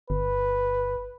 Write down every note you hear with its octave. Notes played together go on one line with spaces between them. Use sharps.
G1 B4